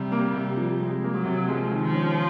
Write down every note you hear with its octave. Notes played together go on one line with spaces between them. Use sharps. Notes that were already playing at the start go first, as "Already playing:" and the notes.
Already playing: C3 G3
A#3
C3
F3
C3 G#3
A#3
F#3
C3
F3 G#3
D#3
F3
C#4